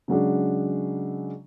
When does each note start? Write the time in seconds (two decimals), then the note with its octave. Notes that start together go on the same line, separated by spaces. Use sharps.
0.08 C#3 F#3 G#3 D4